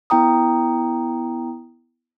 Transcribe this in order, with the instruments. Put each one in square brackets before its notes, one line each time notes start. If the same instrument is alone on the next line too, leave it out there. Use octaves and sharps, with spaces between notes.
[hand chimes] B3 E4 G5 A#5 D#6